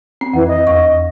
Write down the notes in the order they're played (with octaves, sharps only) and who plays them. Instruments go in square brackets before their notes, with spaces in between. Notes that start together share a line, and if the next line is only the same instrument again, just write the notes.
[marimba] C4
[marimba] F2 [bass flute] E3
[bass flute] D#5
[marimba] E2 C#6